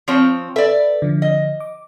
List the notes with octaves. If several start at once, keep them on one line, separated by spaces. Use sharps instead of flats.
F3 C4 C#5
A4 B4 D5 E5
D3 F3
D#5
D6